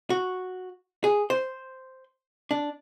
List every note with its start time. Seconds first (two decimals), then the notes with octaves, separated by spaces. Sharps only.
0.10 F#4
1.04 G#4
1.30 C5
2.51 D4